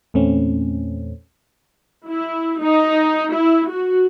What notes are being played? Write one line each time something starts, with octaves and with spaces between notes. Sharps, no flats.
E2 A#2 A3 C4 C#4
E4
D#4
E4
F#4